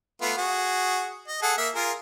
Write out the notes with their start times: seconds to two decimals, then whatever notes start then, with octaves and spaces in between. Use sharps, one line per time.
0.21 A3 B3 F4
0.37 F#4 G#4
1.27 D#5
1.42 G#4 A4 F#5
1.58 A#3 E5
1.75 F4 G#4 A#4